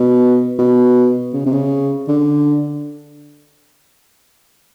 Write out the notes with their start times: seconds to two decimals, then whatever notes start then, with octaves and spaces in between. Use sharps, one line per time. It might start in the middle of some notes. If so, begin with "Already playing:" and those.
Already playing: B2
0.59 B2
1.33 C#3
1.46 C3
1.52 C#3
2.08 D3